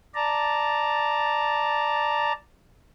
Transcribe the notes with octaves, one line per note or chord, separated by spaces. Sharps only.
D5 A5 A#5